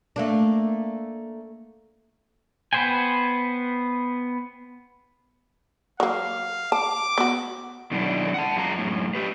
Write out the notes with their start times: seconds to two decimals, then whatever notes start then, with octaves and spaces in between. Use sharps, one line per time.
0.16 A3 A#3 D4
2.73 B3 B4 C5 G5 G#5
6.00 F#3 A#3 F5
6.72 A5 D6
7.18 B3 F#4
7.91 B2 D3 D#3 F#3 D4 E4
8.34 F#5 A5
8.56 F#2 G#3 F4 A#5
8.78 F#2 A2
9.15 G4 B4